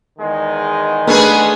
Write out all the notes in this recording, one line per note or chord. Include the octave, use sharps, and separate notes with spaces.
E2 D#3 G#3
A3 B3 D4 G#4 A#4 B4